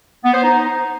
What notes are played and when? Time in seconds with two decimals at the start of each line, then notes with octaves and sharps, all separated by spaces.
0.24 B3
0.34 C5
0.44 D#4